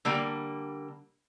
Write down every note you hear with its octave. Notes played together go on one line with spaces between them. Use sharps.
D3 G3 A#3